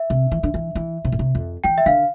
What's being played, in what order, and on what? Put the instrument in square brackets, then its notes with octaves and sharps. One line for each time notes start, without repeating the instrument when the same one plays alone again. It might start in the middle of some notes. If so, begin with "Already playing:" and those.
Already playing: [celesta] E5
[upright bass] C3
E3
D3
E3
E3
C3
A#2
C3
F2
[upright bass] E3 [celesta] G5
[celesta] E5
[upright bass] D3 [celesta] F5